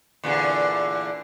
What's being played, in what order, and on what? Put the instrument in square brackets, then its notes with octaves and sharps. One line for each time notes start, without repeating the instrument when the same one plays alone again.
[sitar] E2 A#2 D3